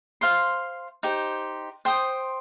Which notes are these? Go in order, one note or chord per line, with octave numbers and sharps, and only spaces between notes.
C5 F5 C6
D#4 G4 C5
C5 G5 C6 D#6